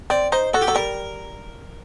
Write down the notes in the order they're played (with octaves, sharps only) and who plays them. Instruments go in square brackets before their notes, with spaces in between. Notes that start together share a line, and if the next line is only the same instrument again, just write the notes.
[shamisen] C4 [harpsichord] D5
[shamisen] D#4 [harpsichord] C5
[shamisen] F#4 [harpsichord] A4
[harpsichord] G4
[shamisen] F#3 [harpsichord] A4
[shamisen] G3 [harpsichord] A#4